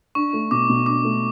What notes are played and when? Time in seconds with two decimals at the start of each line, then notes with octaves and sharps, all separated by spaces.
0.15 D4 C#6
0.33 A3
0.51 B2 D6
0.69 B2
0.86 D4 D6
1.04 A3